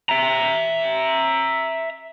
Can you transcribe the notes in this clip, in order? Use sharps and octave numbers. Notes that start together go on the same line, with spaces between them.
E5 A#5